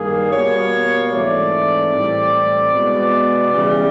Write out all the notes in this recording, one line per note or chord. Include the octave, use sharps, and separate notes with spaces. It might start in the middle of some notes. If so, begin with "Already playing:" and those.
Already playing: G2 D#3 G3 A#3 G#4
B2 G3 A#3 C#5
G#2 E3 A3 C4 D5
A2 E3 G3 C4
B2 G#3 B3
C#3 E3 G3